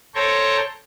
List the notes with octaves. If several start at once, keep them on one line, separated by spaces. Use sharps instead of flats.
A4 C5 C#5 G5 A#5 C#6